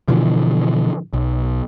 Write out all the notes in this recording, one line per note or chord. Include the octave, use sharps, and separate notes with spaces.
B2 D3 E3 F3
B1